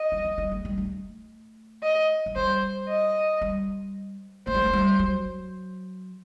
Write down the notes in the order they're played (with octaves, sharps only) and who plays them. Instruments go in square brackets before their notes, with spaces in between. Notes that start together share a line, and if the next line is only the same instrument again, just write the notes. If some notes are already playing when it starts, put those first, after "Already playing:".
Already playing: [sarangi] D#5
[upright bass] G3
F#3
G3
A3
G3
A3
[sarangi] D#5
[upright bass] F#3
[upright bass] G3 [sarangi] C5
[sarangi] D#5
[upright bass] G3
[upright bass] A3 [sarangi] C5
[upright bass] G3
A3
G3
F#3